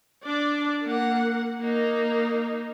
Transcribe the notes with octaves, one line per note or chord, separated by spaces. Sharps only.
D4 D5
A#3 F#5
A#3 D#4